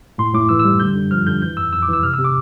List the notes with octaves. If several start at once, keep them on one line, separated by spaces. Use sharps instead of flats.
A2 C6
A2 D6
E3 E6
E6
G3
D3 G6
D3
F3 F6
D3 G6
E3 G6
F2 E6
F2 E6
D6
E3 E6
C3 F6
E6
C3
D6